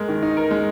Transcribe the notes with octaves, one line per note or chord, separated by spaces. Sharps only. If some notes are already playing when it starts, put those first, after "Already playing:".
Already playing: G#3 A#4
D#3
D#4
A#4
G#3